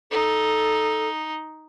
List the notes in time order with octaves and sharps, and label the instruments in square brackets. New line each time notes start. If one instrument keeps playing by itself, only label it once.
[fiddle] D#4 [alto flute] A4